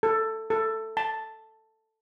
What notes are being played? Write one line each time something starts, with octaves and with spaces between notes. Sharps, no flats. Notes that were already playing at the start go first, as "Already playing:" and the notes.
A4
A4
A5